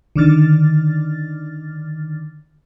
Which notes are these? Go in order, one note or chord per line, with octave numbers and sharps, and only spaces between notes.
D3 D#3 D6 F6 A6